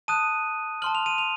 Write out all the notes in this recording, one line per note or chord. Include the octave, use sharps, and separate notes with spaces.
A5 D#6 F#6 D#7
A5 C6 F6 F#7
F7
D#7
F7